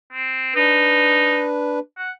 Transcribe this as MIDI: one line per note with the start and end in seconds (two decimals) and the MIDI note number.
0.12 0.55 60
0.55 1.79 62
0.55 1.44 63
0.55 1.79 71
1.98 2.11 78